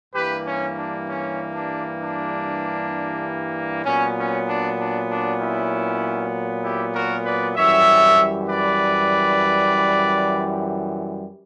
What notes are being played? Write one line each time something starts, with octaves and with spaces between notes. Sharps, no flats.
G2 E3 G3 A#3 G4 B4
C#4
D4
C#4
D4
D4
A#2 F#3 B3 C#4
C#4
D4
D4
D4
C#4 E4
E4 G4
F#4 A#4
B4 D5
F#2 E3 G3 C#5 E5
B4 D5